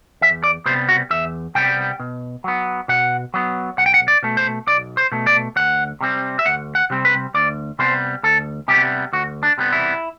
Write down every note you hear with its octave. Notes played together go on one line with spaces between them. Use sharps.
E2 E5
D5
C3 G3 B3 C5
F#4
E2 E5
C3 G3 B3 G5
B2
F#3 B3
B2 F#5
F#3 B3
B1 F#5
G5
F#5
D5
B2 A3
C5
B1 D5
C5
B2 A3
D5
D2 F#5
C3 G3 C4
E5
D2 F#5
F#5
C3 G3 C4
B4
D2 D5
C3 G3 B3 C5
D2 A4
C3 G3 B3 G4
D2 F#4
D4
C3 G3 B3
E4